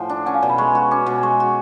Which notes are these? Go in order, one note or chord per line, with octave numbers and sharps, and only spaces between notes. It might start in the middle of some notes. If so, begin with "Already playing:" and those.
Already playing: A2 F3 F#5 G#5 A5
D4
C#4 F#5
F5
B2 D5
B5
G#3 C#6
F#4
C#4 D6
B2
G#3 C#6
F#4